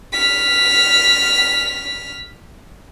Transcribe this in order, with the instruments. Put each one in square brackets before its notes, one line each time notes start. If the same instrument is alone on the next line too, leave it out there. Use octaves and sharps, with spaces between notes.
[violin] F6 B6